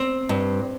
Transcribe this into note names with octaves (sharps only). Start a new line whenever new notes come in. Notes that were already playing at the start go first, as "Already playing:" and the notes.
Already playing: C4
G2